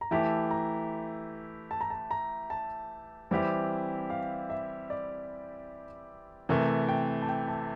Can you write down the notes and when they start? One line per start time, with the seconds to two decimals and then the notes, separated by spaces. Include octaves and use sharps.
0.01 A#5
0.11 E3 A3 E4 G4 A5
0.51 A#5
1.71 A5
1.81 A#5
1.90 A5
2.11 A#5
2.50 A5
3.31 E3 G3 C4 E4 G4
4.10 F5
4.50 E5
4.90 D5
6.49 C3 E3 A3 A#4
6.89 G5
7.22 A5
7.29 G5
7.48 A5